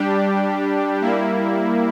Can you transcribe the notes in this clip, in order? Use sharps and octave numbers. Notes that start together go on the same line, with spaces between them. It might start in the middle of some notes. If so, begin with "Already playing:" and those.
Already playing: G3 D4 G4
G3 A#3 E4